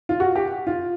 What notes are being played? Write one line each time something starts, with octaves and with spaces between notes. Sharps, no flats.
F4
F#4
G4
F4